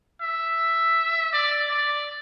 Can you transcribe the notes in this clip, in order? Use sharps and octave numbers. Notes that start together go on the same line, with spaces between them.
E5
D5
D5